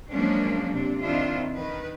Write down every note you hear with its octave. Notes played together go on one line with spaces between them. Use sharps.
F3 F#3 G#3 A#3 C#4 D4
C3 D4
D#3 C4 D4 E4 F4
D#3 B4